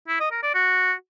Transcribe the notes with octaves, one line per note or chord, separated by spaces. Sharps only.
E4
D#5
A#4
D5
F#4